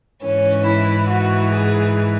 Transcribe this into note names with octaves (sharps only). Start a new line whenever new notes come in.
G#2 E3 C#4
E4
F#4
G#4